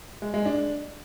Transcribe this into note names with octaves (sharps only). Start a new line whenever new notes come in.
G#3
G#3
D4